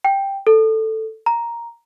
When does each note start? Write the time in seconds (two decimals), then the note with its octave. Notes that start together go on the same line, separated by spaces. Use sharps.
0.04 G5
0.47 A4
1.26 A#5